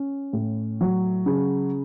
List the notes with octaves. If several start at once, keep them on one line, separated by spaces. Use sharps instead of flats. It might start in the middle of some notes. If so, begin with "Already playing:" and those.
Already playing: C#4
A2
F#3
C#3